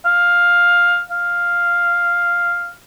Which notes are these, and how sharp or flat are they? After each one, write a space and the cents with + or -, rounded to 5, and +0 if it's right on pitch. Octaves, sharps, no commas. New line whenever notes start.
F5 +10
F5 +0